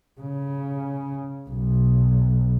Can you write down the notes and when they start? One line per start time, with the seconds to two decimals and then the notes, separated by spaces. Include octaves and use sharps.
0.21 C#3
1.49 B1